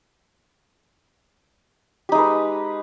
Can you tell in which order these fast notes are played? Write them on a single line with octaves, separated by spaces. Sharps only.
G4 D#4 G#3 B4